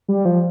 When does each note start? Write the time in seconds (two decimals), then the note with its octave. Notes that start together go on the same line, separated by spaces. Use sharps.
0.08 G3
0.25 F3